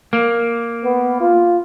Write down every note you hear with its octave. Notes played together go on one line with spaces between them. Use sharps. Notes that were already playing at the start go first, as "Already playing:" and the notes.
A#3
B3
F4